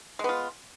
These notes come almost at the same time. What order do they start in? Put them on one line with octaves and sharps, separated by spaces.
G#3 B3 F4